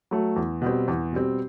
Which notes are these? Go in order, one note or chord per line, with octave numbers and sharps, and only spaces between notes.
F#3 A3
E2
B2 G3 C4
E2
B2 G3 C4